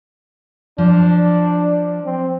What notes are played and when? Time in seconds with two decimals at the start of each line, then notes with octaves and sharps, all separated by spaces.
0.78 F3 D4
2.05 C4